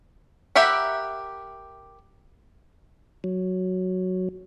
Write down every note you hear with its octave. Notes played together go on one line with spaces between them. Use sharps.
G4 A#4 E5 F#5 B5
F#3